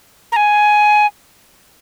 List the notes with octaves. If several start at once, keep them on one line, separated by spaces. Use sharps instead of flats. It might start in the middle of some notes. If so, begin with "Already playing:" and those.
A#5
G#5